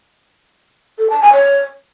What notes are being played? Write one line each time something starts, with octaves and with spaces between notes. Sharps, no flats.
A4
A5
G#5
C#5